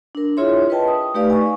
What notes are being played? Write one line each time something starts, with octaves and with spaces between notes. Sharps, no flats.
D4 A#4
E4 F4 G#4 C#5 E5 C6
B4 D#5 G5 A5
D#6
A3 D#4 G4 B4 D5 F5
G#5 C#6